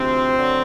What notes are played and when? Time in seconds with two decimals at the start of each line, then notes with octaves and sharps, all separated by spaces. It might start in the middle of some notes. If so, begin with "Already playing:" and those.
Already playing: D2 C3 F3 C4
0.38 D2 D3 F#3